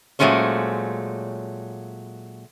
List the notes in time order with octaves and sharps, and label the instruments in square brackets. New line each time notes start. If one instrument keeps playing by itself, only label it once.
[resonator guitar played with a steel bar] A#2 F#3 G#3 A3 C#4 C5